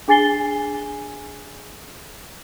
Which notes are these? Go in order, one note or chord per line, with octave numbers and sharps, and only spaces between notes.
D4 G#4 G#5 A6 C7 G7